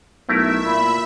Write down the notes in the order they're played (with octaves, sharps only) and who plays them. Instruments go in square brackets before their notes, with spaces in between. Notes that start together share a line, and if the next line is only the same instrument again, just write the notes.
[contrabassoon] B1 [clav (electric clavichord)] A3 E4 A#4 [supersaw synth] E5
[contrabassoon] A#2 [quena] B5